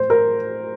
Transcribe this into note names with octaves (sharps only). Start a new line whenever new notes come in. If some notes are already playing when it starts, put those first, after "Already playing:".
Already playing: A2 C5
A#4